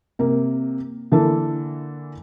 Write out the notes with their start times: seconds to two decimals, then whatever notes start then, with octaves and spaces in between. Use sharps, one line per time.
0.19 C3 A#3
1.12 D3 E3 A#3 E4 A4